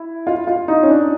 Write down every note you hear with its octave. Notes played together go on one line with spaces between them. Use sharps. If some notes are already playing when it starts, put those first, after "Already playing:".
Already playing: E4
F4
F4
D#4
C#4
D4